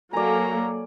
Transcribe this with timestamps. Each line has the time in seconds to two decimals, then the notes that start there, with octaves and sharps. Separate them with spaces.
0.13 F#3 A#3 A4 D5 G#5 A#5